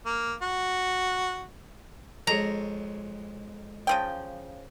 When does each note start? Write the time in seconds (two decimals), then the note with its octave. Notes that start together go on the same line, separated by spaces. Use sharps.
0.06 A#3
0.42 F#4
2.27 F2 G#3 C#5 A#5
3.87 C#3 F3 G5